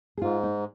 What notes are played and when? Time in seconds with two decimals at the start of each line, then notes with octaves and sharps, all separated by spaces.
0.17 G#4
0.22 G#2 F4
0.44 D#4